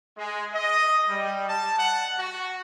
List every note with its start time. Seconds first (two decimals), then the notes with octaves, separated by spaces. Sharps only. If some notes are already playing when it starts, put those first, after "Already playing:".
0.18 G#3
0.53 D#5
1.08 G3
1.48 A5
1.79 F#5
2.18 F#4